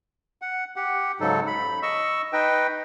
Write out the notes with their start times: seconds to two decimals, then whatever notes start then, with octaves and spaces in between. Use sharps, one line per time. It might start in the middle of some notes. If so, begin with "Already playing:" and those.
0.42 F#5
0.76 G4 F#5
1.20 G#2 C#3 F#3 D#4 A4
1.47 B5
1.83 D#5 C#6 E6
2.33 D#4 B4 D#5 G5